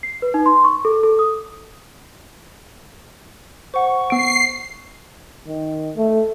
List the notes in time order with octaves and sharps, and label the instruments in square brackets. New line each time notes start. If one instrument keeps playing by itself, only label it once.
[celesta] C7
B4
D#4
C6
C#6
A4
A4
D#6
[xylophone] C5 F#5 [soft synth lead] C#6
[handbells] B3 D7 [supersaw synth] C7
[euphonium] D#3
A3